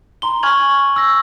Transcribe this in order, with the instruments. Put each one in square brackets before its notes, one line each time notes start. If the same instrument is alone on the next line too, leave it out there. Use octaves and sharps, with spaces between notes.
[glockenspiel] A#5 C6 G7
G#5 C#6 F6 G#6 F7 F#7
E6 A#6